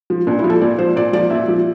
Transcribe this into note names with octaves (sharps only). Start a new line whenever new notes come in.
F3
A#2 D4
E4
F3
A4
A#2 D5
F3 C5
A#2 D5
F3 D5
A#2 E5
F3